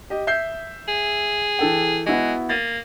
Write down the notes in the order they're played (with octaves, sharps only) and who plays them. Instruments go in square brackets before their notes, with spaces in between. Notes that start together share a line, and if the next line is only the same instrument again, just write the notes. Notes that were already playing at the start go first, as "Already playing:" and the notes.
[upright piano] G4 D#5
E5 G6 C7
[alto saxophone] G#4
[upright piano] E3 A4 G5
[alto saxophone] G#3 [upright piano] B3 E4 F#4
[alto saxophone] A#3 [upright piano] A6 D#7